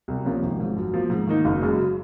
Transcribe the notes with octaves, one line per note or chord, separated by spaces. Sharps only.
C2
C3 F3 A#3 C#4
G#1
G#2 F3
F#2
F3 A#3
G#2
D#3 A#3 D#4
F#1
F#2 C#3 G#3